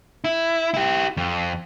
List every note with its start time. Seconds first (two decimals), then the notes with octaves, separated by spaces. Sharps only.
0.24 E4
0.74 E4 G4
1.17 F2